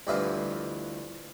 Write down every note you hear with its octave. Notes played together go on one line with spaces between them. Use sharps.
D2 G2 E3 F3 D#5